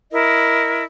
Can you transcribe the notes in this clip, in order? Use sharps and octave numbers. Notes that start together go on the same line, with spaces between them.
E4 A#4 D#5